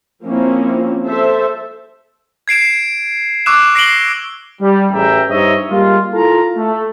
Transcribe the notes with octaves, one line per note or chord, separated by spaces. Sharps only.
F3 A#3 C4 C#4 E4
A4 C5 E5
G#6 C7 D7 E7
C#6 D6 E6 F#6 E7
A#6 C7 D7 E7 F#7 G7
G3
A1 E4 G#4 E5 G5 A#5
G2 D#4 C5 C#5 D#5 E5
G3 G#3 A#3 F4
E4 F4 A4 A#4 F5 A#5
A3